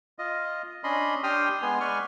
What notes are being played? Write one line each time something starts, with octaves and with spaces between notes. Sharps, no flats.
F4 D#5
C#4 D4 D#5 B5 C6
D4 G4 G5 C6 D#6 F6
G#3 B3 G#5 C6
G#3 B4 D5 G#5 C#6 F6